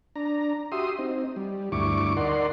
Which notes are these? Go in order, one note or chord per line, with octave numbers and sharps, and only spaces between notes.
D4 A#5
F#4 G4 E5 C6 D#6
C4 D#4
G3
D2 G2 E4 C#6 D6
D#4 A#4 D5 F#5 C6